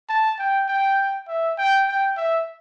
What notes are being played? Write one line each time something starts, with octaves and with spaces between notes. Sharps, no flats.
A5
G5
G5
E5
G5
G5
E5